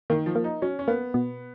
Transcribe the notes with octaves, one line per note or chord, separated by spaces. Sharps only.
D#3 A#3
F3
A#3
D#4
F#3 C#4
C#4
A#3 B3
B2